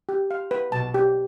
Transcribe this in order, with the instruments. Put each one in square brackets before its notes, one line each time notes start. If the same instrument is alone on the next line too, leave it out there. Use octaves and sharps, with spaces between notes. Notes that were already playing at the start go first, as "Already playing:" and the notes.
[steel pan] G4
F5
B4
[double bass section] B1 B2 [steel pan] A5
[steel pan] G4